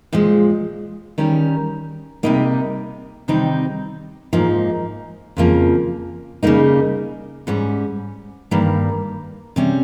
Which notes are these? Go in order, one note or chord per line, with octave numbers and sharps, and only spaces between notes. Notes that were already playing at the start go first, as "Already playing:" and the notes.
A#2 F3 G#3
D#3 G3 C#4
C3 G3 A#3 D#4
C3 D#3 G3 C4 D#4
G#2 F3 A#3 D#4
F2 C#3 F3 A#3
C#3 G3 A#3 D#4
G#2 G3 C#4
G2 D#3 G3 A#3
C3 G3 C#4